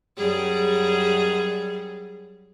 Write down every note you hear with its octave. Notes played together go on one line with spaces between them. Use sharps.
F#2 G3 G#4